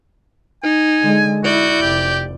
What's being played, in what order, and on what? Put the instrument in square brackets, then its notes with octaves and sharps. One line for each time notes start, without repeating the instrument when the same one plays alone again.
[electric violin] D#4 [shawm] G#5
[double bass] D3 G#3
[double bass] E4 [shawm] F#4 [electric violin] D5 G6
[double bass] F1 [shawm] G4